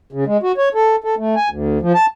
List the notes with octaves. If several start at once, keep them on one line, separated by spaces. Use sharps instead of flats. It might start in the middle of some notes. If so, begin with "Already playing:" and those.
C#3
G#3
F#4
C#5
A4
A4
A3
G#5
D2
F3
A5